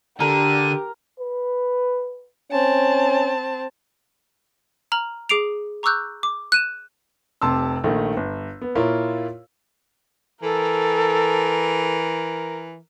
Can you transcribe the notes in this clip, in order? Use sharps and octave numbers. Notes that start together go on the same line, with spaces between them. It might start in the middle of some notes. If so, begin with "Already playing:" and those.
D3 G4 A4 A#4 D#7
B4
C4 C#4 A5
A#5 F6 F#7
G#4 D6 C7 D7 F7
A#5 C#6 D6 E6 F#6 G6
D6
F#6 D#7 E7
F1 C3 A5 C6 E6
A#1 D#3 A3
G1
B3
A#2 E4 F4 A#4 C#5
E3 A4 A#4